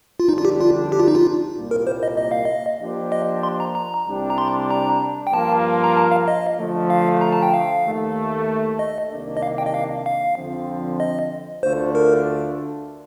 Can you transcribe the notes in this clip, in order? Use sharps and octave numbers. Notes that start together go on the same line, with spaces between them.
F4
F2 D3 G3 D4 D#4
F4
G4
F4
G4
F4
D#4
F4
C2 A#2 G3 A#3
A#4
C5
D#5
D#5
F5
D#5
F3 A#3 D4 G4 C5
D#5
C6
A#5
A#5
C2 C3 G3 D4 G4
A#5
C6
A#5
G5
G2 F3 A#3 F4 A#4 A5
A#5
A5
F5
D#5
D3 F3 A3
F5
A#5
A5
G5
F5
D#2 D#3 A3
D#5
C2 C3 D#3 A#3 D4
D#5
F5
G5
D#5
F5
F5
F2 D3 F3 C4
D#5
D2 D3 A3 D4 F4 C5
A#4